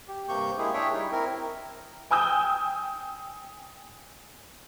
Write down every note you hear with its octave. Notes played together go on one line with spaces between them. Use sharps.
G4
G2 C3 A#3 G4 C#6 G6
G#3 A#3 E4 G4 G#4
D4 G#4 C#5 E5 G5
G3 D#4 E4
C4 E4 A#4
G5 G#5 D#6 E6 G6